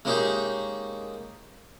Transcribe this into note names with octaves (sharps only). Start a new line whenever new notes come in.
G#3 A#3 C#4 D#4 G4 G#4